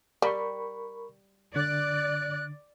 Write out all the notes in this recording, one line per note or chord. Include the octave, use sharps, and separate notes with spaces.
G3 A#4 B5 C#6
D3 D5 F#6